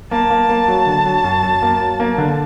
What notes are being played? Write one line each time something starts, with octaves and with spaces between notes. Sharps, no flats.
A#3 A5
A#3
A#3
F#3
D3
F#3
F#2
F#2
A#3
F#3
A#3
D3